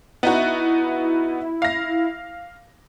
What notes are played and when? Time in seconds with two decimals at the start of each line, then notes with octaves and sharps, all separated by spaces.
0.23 B3 D#4 E4 F#4
1.62 F5 A#6